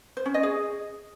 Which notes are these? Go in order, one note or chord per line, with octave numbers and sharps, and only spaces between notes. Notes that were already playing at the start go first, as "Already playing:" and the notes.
C5
C#4
D#5
G#4